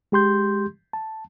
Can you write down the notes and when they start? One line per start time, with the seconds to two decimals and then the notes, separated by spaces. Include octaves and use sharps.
0.12 G#3 G4 C6 G6
0.93 A5